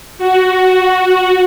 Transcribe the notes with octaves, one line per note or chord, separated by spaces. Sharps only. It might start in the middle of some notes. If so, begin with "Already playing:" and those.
F#4